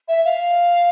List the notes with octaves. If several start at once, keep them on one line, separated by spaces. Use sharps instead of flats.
E5
F5